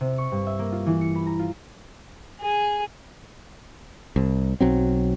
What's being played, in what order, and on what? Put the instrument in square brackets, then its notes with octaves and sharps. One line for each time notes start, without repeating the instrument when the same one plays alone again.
[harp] C3
C#6
G2
E5
A#3
F4
E3
C#7
B5
A#5
F4
[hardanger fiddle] G#4
[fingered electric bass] C2
B1 F#3 C4